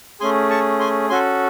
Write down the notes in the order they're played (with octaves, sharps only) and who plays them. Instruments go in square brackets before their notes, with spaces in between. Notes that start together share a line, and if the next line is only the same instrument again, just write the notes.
[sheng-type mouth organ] A3 C#4 G#4 G#5 C6
A5 C#6
G#5 C6
C#4 F#4 A4 G#5 C6